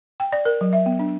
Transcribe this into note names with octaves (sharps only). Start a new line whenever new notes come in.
G5
D5
A#4
F#3
E5
B3
D4